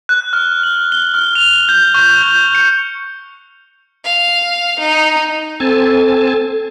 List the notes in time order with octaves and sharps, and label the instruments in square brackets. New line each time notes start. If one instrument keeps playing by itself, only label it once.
[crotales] F#6
F6
F#7
G7
F6
F7
G6
C#6
G6
C#7
[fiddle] F5
D#4
[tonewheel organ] C4 G#5 A5 [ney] A4